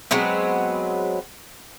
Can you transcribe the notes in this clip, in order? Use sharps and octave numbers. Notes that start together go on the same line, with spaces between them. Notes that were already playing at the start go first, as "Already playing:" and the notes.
F#3 G#3 B3 C4